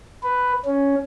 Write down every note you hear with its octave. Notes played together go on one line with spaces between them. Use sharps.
B4
C#4